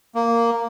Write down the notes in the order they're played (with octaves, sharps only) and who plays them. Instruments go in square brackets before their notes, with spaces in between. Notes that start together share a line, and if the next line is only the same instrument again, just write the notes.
[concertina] A#3